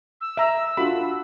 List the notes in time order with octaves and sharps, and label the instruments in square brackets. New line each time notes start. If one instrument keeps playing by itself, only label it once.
[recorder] E6
[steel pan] E5 A#5
[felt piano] D4 F4 F#4 [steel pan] B5